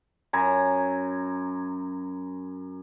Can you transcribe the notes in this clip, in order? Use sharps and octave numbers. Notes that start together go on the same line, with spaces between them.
F#2 G#5 A#5